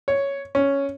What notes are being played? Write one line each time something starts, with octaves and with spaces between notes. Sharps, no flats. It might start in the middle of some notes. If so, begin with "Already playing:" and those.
C#5
C#4